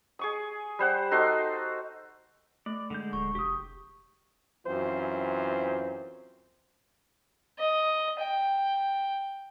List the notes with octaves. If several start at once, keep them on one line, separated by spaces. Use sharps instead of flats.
G#4 C#6 D#6
G3 C5 F#5
D#4 F#4 A4 C6
A3 D5
D3 G#3 G6
D1 C#6
F1 G4 D#6
F#2 E3 C4 F4 C5
D#5
G5